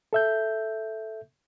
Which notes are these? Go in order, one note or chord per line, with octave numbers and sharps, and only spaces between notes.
A4 E5 G6